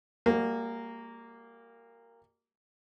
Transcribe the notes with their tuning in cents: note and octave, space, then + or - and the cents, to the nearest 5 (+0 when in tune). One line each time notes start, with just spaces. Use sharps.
G3 +40 A#3 -10 F#4 +0